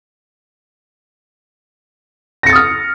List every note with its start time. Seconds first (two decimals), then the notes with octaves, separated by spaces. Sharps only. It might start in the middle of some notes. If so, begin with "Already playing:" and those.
2.43 A#6
2.46 C#7
2.49 A6
2.52 D#6
2.56 F6